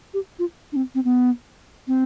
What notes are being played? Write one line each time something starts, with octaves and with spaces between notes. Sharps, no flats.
G4
F4
D4
C4
C4
B3
C4